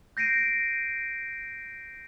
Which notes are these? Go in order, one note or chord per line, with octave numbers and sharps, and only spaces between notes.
G6 A#6 C7 D7 D#7